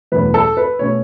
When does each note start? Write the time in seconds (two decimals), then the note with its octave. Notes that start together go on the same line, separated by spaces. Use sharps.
0.12 F#1 E2 B2 A3 C#4 B4
0.34 A4
0.57 B4
0.79 B2 A3 C#4 C#5